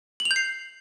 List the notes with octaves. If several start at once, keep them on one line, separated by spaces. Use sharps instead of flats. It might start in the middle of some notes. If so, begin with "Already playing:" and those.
F#7
F7
G6
C7